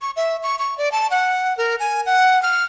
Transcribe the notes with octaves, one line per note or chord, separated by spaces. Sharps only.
C#6
E5
C#6
C#6
D5
A5
F#5
A#4
G#5
F#5
F6